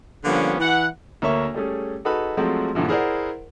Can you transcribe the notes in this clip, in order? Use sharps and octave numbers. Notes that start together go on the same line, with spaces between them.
D3 F3 G3 A#3 B3 C#4
E3 F#5
D2 A#3 C#5 E5 C#6
G3 A3 C#4 G#4
D#4 F#4 G#4 A4 B4 B5
F3 F#3 G#3 A3 C4 F#4
G2 A#2 D3 E3 F3
E4 G#4 A#4 C5 D5 F#5